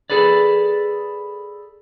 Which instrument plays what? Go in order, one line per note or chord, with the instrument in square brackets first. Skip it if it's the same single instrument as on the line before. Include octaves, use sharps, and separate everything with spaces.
[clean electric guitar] G#4 A4 B4 D5